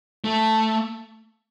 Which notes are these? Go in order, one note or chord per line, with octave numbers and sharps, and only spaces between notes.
A3